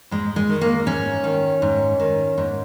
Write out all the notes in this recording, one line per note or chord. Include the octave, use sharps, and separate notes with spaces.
G#2 G#3
G#3
D#3
A#3
G#2 C#4
D#3
G#2
D#3
G#2